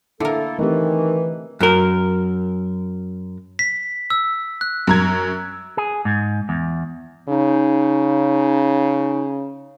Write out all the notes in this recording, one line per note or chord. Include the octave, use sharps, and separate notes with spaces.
D3 A3 A#3 E4 A4 A#4
D#3 E3 A3 C4 G4
F#2 A#4
B6
E6
F#6
F#2 A#5 G#6
G#4
G#2
E2
C#3 D#4